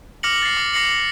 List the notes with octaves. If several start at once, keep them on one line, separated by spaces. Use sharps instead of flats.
D6 F6 A#6 C#7 F#7
A6 C7
D6
D6 A#6 C7 C#7 F#7